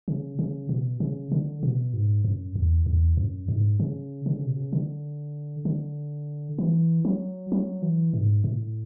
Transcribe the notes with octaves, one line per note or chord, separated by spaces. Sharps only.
C#3
C#3
B2
C#3
D3
B2
G#2
F#2
E2
E2
F#2
G#2
C#3
D3
C#3
B2
C#3
D3
D3
E3
F#3
F#3
E3
G#2
A2